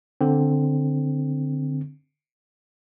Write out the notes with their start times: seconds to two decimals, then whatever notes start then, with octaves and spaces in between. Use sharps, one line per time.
0.21 D3 C4